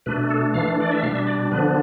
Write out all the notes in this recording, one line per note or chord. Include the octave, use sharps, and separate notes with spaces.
B2 A3 D4 B4
A4
E3 A3 D4 F5
D5
E5
B2 G3 D4 F5
E5
D5
D3 F3 B3 D4 B4